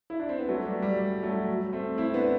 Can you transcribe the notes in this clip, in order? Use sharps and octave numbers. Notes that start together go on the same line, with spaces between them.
E4
D4
C4
B3
F#3 A3
G3
G3
G3
F#3 A3
A3 C4
C4 E4
B3 D4